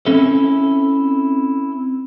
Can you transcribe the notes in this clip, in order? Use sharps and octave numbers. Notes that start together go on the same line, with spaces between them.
C4 C#4 E4 A4 E5